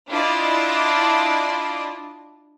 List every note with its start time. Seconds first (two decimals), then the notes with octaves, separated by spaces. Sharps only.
0.10 D4 E4 F4 D5 D#5